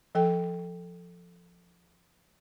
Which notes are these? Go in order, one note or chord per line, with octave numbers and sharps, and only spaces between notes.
F3 A4 G5